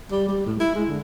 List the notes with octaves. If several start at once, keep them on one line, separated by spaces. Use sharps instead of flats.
G3
G3
A2
E4
G#3
D3